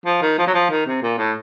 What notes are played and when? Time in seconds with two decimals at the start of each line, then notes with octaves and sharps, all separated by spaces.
0.06 F3
0.22 D#3
0.38 F3
0.47 F#3
0.54 F3
0.70 D#3
0.86 C3
1.02 A#2
1.18 A2